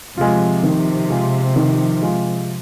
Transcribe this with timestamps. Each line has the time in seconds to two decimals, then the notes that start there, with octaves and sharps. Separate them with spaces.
0.17 C3 F3 G#3 F4
0.63 D#3
1.10 G#3 F4
1.56 D#3
2.02 G#3 F4